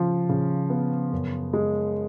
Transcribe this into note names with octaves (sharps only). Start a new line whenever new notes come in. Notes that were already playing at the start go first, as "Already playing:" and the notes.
Already playing: C#3 F3
C#3
B3
F#2
G#3